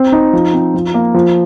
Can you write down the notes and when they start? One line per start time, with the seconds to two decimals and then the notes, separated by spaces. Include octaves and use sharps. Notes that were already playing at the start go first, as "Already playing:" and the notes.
Already playing: C4
0.12 D#4
0.33 F3
0.53 C4
0.74 F3
0.94 A#3
1.14 F3